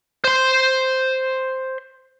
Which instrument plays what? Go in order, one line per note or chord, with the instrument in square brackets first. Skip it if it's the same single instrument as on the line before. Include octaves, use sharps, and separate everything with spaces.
[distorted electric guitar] C5 C6